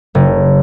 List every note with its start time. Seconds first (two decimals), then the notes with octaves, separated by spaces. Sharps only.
0.15 F#1